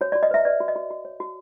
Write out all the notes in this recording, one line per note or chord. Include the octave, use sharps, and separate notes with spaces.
F#4 C#5
D5
F#4
D#5
B4 E5
B4 D5
F#4
D#5
F#4
F#4
C#5
F#4